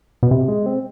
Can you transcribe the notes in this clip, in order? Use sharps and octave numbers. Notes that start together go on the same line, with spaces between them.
B2
C3
G#3
C4